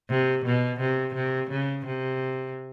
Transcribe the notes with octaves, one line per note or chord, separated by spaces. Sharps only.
C3
B2
C3
C3
C#3
C3